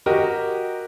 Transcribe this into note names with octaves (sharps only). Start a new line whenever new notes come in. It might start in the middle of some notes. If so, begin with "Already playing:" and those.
F#4 G4 A#4 D#5